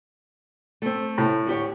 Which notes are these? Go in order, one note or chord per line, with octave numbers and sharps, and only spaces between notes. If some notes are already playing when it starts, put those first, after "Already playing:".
A3 C4
A2
D2 G4 C#5